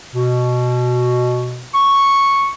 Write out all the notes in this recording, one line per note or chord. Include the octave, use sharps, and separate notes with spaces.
B2
C#6